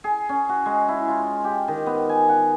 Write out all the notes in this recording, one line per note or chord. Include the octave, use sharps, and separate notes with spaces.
G#4
C#4
F#4
G#3
E4
F4
G4
D#3
B3
G#5
F#5